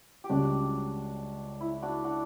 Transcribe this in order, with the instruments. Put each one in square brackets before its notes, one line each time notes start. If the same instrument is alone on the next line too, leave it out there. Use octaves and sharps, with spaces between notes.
[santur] G4
[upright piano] C#2 C#3 G3 [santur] D4 F#4
[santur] E4
D4 F#4
D4 F#4